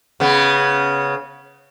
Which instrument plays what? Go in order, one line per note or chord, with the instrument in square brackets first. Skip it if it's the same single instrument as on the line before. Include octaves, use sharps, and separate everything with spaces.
[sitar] C#3 B3